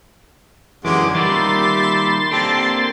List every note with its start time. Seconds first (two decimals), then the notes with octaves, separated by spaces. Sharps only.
0.85 F#2 D3 E3 G#3 C#4 F#4 G4 D6
1.14 D#3 G3 A#3 E5 B5 C6 A6
2.31 A#3 C4 D4 G4 A4